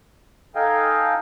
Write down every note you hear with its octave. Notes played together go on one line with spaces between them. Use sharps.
D#4 A4 D#5 F5 G5 G#5